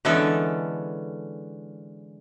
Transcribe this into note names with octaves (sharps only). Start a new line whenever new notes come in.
D3 E3 G#3 B3 C#4 A4